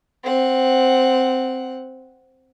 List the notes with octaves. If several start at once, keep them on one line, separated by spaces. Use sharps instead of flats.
C4 F#5